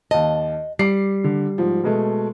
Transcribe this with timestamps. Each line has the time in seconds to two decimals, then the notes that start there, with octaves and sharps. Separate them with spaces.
0.11 D#2 D#5 A5
0.79 G3 D6 C7
1.24 D3
1.58 G#2 F3
1.83 B2 G#3 A3